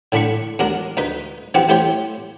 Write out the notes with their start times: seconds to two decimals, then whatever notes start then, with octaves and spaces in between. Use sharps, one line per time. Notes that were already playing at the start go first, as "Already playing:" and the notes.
0.12 A2 D3 D4 B5 C#6
0.59 D#2 D4 F#4 A#4
0.97 D2 D#4 B4
1.54 E3 C4 F#4 G4 F#5
1.69 A3 E4 G4 C5 C#5